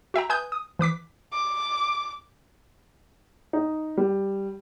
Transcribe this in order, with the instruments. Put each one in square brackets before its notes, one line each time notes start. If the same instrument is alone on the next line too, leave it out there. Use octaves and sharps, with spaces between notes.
[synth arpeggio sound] F#4 E5 G5 A#5
B4 G#5 D#6 G6
D#6
E3 B4 D6 B6
[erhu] D6
[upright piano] D#4
G3